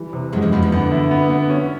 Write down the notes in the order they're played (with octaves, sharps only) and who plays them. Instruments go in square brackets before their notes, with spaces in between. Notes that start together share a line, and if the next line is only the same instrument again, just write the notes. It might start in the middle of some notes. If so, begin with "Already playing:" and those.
Already playing: [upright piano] E3 G3
C3
[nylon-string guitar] F#2 F#3 [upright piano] G#3
[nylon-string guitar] F2 F3
[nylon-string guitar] F2 F3 [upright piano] B3
[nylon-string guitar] E2 E3
[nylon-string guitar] D3 [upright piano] B3
[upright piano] E4
B3
B3
C#4